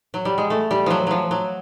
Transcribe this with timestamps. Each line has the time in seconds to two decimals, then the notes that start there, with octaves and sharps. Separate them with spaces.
0.14 F#3
0.25 G3
0.38 G#3
0.50 A3
0.71 G3
0.86 F3 F#3
1.07 F3 F#3
1.31 F#3